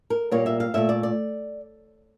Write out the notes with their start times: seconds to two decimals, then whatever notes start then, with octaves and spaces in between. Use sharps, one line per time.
0.10 A#4
0.31 A#2 G3 A#3 C#5
0.46 E5
0.60 F5
0.74 A#2 A3 E5
0.89 D5
1.03 D5